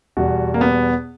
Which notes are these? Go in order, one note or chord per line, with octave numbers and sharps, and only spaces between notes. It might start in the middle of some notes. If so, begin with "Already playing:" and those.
E2 B2 G3 F#4
A#3
B3